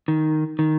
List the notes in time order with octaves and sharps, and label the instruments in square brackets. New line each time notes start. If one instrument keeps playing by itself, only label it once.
[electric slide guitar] D#3
D#3